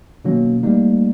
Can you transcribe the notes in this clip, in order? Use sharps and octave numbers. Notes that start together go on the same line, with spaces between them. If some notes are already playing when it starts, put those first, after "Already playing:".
B2 D#3 F#3 A#3 C#4
G3 A3 A#3 D#4